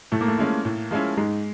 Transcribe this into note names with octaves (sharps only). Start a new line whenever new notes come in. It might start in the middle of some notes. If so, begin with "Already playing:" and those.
A2 A3
A#3
A3
F3 G#3 C#4 E4
A2
F3 G#3 C#4 E4
G#2 G#3